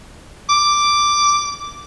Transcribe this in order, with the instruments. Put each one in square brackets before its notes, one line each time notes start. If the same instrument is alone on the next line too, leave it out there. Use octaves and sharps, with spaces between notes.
[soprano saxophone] D6